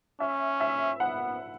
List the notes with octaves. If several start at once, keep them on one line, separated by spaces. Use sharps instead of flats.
C#4 E5
E5
B3 F#5